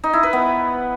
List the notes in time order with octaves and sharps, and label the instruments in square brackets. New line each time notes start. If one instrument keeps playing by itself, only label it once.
[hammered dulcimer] D#4
E4
B4
B3